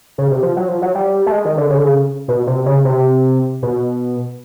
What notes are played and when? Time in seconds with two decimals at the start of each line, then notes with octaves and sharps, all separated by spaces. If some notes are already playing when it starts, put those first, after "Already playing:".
0.18 C#3
0.31 C3
0.43 F3
0.57 F#3
0.68 F3
0.82 F#3
0.95 G3
1.26 A3
1.32 G#3
1.45 D#3
1.57 D3
1.70 C#3
1.77 D3
1.84 C#3
2.28 B2
2.47 C3
2.66 C#3
2.85 C3
3.63 B2